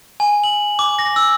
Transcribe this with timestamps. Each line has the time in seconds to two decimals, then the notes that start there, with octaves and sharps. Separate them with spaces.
0.20 G#5
0.44 F#7
0.79 D6
0.99 A#6
1.16 E6